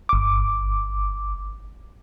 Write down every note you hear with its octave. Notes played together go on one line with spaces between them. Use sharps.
G1 D6